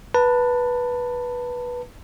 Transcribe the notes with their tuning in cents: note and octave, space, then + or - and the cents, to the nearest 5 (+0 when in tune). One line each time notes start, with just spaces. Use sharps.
B4 -10 A5 +25